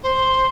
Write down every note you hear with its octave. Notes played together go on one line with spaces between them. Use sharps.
C5